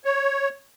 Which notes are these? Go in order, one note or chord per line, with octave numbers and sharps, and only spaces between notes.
C#5